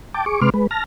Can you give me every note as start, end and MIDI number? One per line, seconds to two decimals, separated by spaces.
0.14 0.25 79
0.14 0.25 81
0.14 0.25 86
0.26 0.40 68
0.26 0.40 85
0.26 0.40 86
0.41 0.50 48
0.41 0.50 56
0.41 0.50 71
0.41 0.50 84
0.41 0.50 86
0.41 0.50 89
0.54 0.67 56
0.54 0.67 71
0.71 0.84 81
0.71 0.84 89
0.71 0.84 94